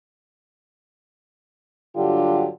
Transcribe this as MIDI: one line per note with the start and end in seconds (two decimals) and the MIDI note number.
1.96 2.48 43
1.96 2.48 50
1.96 2.48 54
1.96 2.48 62
1.96 2.48 65
1.96 2.48 67